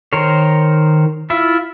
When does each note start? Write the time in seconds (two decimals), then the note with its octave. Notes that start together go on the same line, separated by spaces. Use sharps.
0.13 D#3 A#4 C5 C#5
1.30 E4 F4 E5